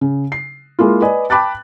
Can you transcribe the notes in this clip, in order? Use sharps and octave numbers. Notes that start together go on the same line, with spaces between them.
C#3
C7
G#3 A#3 E4 F4
B4 D5 D#5 G#5
G5 A5 B5 D6 F#6 A6